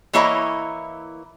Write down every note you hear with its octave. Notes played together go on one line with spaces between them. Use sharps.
E3 A#3 E4 C#5 D#5 A#5